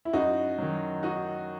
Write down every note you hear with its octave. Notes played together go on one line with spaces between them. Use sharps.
E4
F#2 D#4 F#4
D#3 F#3
D#4 F#4